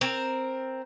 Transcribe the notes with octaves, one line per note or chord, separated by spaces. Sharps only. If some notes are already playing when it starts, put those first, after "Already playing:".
C4 A#4